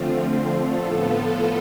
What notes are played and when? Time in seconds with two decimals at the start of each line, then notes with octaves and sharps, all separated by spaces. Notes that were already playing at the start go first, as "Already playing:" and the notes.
Already playing: D3 F3 A3 C4 F4
0.72 A2 F3 B3 F4 A4